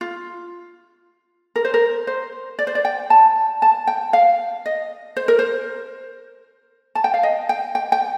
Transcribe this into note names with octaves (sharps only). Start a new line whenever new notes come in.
F4
A#4
C5
A#4
C5
D5
C5
D5
G5
A5
A5
G5
F5
D#5
C5
A#4
C5
A5
G5
F5
D#5
G5
G5
G5